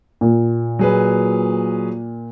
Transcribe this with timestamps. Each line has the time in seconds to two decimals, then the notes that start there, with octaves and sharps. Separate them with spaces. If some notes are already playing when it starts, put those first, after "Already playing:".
0.21 A#2
0.79 F#3 G#4 B4